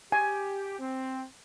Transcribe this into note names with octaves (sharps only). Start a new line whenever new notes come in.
G4 G#5
C4